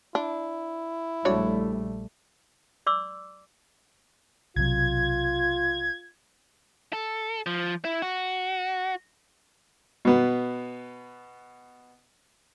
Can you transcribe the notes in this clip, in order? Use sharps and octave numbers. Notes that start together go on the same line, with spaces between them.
D4 E4
A#1 G3 A3 D4 F#4 C#5
D5 C6 D6 E6
B1 C3 F#3 F4 G#6
A4
F3
E4
F#4
B2 B3